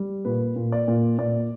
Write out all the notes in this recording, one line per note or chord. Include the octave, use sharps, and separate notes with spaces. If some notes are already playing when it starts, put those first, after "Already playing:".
Already playing: G3
A#2 B4
A#2
D5
A#2
A#2 D5